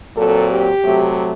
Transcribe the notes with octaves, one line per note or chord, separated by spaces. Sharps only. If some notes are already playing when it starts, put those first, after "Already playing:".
A#2 F#3 C4 A4
G4
C3 F#3 A3